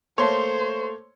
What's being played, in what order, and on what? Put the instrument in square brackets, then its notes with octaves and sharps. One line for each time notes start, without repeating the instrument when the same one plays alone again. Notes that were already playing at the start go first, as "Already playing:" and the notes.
[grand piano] A3 A#3 A4 [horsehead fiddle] C5 [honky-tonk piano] C#5 C6